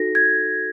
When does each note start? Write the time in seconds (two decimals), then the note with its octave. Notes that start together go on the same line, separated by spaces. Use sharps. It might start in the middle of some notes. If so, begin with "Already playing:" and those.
Already playing: D#4 F#4 A4 A#6
0.15 G#6